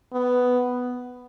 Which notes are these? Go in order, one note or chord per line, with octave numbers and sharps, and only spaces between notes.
B3